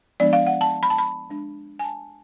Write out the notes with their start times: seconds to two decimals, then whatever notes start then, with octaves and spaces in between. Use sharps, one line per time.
0.20 F3 G#3 B3 D4 D5
0.33 F5
0.47 F#5
0.61 A5
0.83 B5
0.90 A5
0.98 B5
1.29 G#3 D4
1.79 G#5
1.84 A5